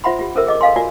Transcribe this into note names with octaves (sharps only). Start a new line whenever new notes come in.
F4 C5 E5 F#5 B5 C6
F4 G4
C#4 A4 A#4 C5 E5 E6
G#4 D#5 D6
A4 D#5 F5 G#5 C6
F4 F#4 A#4 D5 G#5